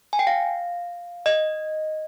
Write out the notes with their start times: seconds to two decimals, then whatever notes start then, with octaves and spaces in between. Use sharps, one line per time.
0.13 G#5
0.19 G5
0.27 F5
1.26 D#5